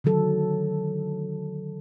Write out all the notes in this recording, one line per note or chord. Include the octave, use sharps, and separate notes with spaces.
D3 D#3 F#3 A4